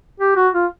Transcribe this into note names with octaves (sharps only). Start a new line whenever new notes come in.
G4
F#4
F4